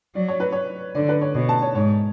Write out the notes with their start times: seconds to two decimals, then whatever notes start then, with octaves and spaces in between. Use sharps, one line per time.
0.15 F#3 D5
0.28 C#5
0.40 B4
0.52 C#5
0.95 D3 D5
1.09 B4
1.21 C#5
1.35 B2 C#5
1.49 A5
1.62 C#5
1.75 G#2 C#5